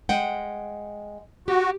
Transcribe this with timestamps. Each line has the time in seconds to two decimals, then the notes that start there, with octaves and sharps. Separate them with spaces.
0.09 G#3 F#5 G5
1.48 F#4 G4